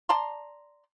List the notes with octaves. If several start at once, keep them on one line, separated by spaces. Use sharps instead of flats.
D5 A5 A#5 C6